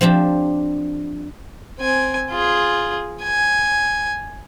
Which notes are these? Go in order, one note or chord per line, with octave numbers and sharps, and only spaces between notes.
F3 C4 D4 G4
C4 G#5
F4 G#4
G#5